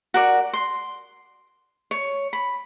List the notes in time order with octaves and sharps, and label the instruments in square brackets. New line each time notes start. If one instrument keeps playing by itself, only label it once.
[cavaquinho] F#4 A#4 D5
C6
C#5
B5